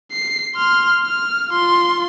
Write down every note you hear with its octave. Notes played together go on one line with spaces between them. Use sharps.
C7
C6 F6
F6
F4 C6